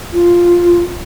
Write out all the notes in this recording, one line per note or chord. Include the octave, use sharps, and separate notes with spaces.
F4